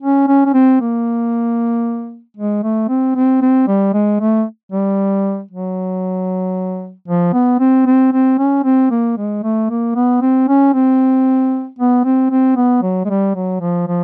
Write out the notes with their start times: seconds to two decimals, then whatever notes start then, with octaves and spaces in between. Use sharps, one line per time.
0.02 C#4
0.28 C#4
0.45 C#4
0.54 C4
0.80 A#3
2.37 G#3
2.63 A3
2.89 C4
3.16 C4
3.42 C4
3.68 G3
3.94 G#3
4.21 A3
4.72 G3
5.51 F#3
7.08 F3
7.33 B3
7.60 C4
7.86 C4
8.13 C4
8.39 C#4
8.64 C4
8.91 A#3
9.18 G#3
9.43 A3
9.70 A#3
9.95 B3
10.22 C4
10.48 C#4
10.74 C4
11.79 B3
12.05 C4
12.31 C4
12.56 B3
12.82 F#3
13.05 G#3
13.10 G3
13.36 F#3
13.61 F3
13.88 F3